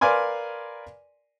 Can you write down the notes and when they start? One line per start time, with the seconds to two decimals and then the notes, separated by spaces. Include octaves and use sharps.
0.01 A#4 B4 D5 F5 G#5 C6